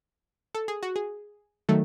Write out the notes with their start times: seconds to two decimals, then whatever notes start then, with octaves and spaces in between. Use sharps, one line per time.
0.55 A4
0.68 G#4
0.83 F#4
0.96 G#4
1.69 D#3 F#3 A3 A4